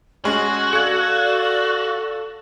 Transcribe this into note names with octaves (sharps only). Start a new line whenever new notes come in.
G#3 C#4 F#4 G#4 G#5
A4 D5 F5 G#6 C#7